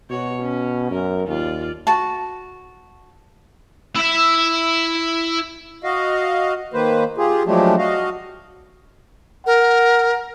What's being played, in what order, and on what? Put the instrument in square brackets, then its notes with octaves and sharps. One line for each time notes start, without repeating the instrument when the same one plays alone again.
[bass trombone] B2 [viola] F#4 C#5
[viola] C#4
[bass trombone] F#2 [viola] A#4
[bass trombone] D#2 [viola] F4 D5
[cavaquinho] F#4 A5
[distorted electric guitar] E4 E5
[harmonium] F#4 D#5 F5
D#3 A#3 B4 C5
F4 G4 G#4
F3 F#3 G#3 A3 D4 G4
F#4 D#5 F5
[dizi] A#4 [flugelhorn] F#5